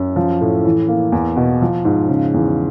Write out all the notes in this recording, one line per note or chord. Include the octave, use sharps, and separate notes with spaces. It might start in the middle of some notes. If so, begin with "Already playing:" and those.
Already playing: F#2
F3
A2
E3
A#3
E2
B2
F3
G#2
C#3
E2